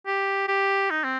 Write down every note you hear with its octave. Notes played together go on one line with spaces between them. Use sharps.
G4
G4
D#4
C4